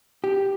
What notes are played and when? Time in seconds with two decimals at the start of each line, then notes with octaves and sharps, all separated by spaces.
0.24 G4